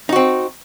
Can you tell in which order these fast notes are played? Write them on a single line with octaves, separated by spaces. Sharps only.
D#4 F#4 C4